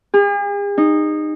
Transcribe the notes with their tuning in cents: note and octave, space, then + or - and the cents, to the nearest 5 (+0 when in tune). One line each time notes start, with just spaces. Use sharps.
G#4 -45
D#4 -20